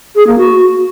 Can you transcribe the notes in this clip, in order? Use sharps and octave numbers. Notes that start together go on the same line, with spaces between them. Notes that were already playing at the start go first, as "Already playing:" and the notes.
G#4
A#3
F#4